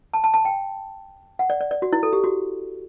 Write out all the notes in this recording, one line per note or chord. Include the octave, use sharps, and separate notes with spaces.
A5
A5
A5
G5
F#5
D5
D5
D5
F#4
E4
A4
G4
F#4